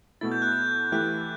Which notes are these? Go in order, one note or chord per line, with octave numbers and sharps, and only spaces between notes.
B2 A3 E4 A6
G6
F#6
G6
E3 A3 E4 G4 F#6